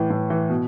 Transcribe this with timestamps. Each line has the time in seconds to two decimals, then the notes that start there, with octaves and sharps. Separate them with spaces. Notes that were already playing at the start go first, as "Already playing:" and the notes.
Already playing: A2 E3
0.10 A2
0.30 E3
0.49 B2